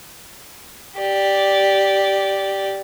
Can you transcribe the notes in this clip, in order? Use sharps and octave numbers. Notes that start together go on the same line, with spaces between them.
G4 D5